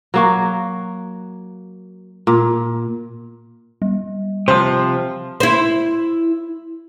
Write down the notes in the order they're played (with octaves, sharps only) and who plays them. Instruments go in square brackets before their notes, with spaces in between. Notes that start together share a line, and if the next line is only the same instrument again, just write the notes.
[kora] F#3 A#3 F#4
A#2
[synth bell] G3
[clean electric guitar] C3 F3 [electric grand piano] C5
[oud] E4 C5